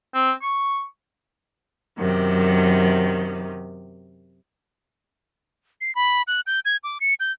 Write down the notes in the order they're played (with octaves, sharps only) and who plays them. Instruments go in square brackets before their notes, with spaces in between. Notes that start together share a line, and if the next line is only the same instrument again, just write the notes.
[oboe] C4
C#6
[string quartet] F#2 C3 D#3
[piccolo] C7
B5
F#6
G6
G#6
D6
C#7
G6